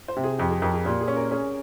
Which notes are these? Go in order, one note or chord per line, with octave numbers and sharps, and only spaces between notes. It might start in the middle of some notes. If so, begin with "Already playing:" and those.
C5
C3
G#4
F2 G4
G#4
F2 A#4
G#4
A#2 G4
G#4
C#4
A#4
C#4 G#4